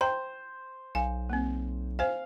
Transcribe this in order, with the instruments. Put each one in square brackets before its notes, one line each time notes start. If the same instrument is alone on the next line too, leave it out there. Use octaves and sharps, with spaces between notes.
[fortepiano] C5 [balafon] G5 A#5
[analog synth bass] B1 [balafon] F5 G#5
[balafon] A#3 C4
[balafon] C5 G#5 [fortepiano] F5